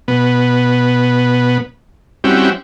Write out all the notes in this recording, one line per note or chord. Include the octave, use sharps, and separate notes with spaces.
B2 B3
G3 C4 C#4 E4 F#4 G4